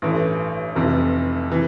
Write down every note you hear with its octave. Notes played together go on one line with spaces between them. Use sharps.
A1 G2 E3 A3
F1 F2 C3 E3
C3 E3